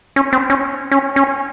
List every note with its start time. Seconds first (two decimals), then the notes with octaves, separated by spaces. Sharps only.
0.16 C#4
0.33 C4
0.50 C#4
0.91 C#4
1.16 C#4